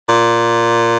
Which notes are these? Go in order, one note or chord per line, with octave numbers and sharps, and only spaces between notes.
A#2